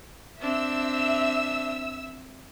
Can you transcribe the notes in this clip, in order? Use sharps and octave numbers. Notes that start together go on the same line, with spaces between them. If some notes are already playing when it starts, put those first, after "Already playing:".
C4 D4 E5 E6